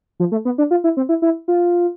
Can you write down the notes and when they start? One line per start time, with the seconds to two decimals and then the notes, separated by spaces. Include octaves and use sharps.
0.20 F3
0.32 A3
0.45 B3
0.58 D4
0.71 F4
0.84 E4
0.97 C4
1.09 E4
1.22 E4
1.48 F4